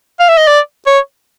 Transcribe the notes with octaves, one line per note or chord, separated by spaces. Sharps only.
F5
E5
D#5
D5
C#5